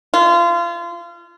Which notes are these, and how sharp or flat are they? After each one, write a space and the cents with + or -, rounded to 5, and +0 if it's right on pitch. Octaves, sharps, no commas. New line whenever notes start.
F4 -30